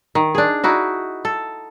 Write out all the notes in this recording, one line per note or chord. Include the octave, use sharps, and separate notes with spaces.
D#3
D4 G#4
D#4 E4 F#4
A4